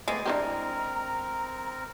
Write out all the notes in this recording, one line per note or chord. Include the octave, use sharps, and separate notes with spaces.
G#3 A3 B3 C4 D5
C4 D4 E4 G4 A#4 A#5